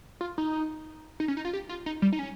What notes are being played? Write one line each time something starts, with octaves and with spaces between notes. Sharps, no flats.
F4
D#4
D#4
C#4
D#4
F4
G4
F4
D#4
G3
D#4
C#4